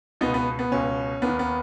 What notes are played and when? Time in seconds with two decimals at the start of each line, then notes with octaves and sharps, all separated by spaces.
0.21 C#2 B3 D#4
0.26 B2
0.34 B3
0.59 B3
0.72 C#2 B2 C#4
1.22 D#2 D#3 B3
1.39 B3